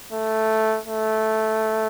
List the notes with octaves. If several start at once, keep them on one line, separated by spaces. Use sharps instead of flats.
A3
A3